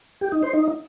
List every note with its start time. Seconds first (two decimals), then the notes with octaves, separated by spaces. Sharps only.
0.21 G4
0.32 D#4
0.43 C5
0.53 D#4